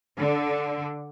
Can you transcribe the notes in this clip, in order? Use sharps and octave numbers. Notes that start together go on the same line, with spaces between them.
D3